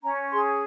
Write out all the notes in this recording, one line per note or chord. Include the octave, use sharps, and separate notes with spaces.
C#4 A#5
G#4 C6